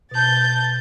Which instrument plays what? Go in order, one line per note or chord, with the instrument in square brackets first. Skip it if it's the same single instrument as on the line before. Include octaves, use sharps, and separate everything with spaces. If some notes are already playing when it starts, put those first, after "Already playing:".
[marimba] B2 A5 [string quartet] G6 A6